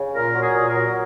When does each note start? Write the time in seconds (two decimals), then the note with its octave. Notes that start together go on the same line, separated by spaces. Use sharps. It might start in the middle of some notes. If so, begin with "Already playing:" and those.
Already playing: C#3
0.14 A#2 A#4
0.34 F#3
0.41 G#4
0.54 A#2
0.68 A#4
0.75 F#3